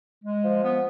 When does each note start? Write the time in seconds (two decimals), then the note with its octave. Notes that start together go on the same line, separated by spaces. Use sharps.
0.24 G#3
0.44 F3
0.64 B3